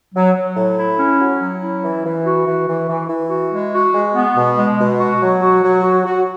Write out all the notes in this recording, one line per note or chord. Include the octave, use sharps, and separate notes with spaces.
F#3
F#3
A2
E4
C#4
F#3
F#3
E4
E3
E3
F#4
E3
E3
E3
E3
F#4
G#3
F#4
G#3
B3
B2
G#3
B2
F#4
F#3
F#4
F#3
F#4
F#4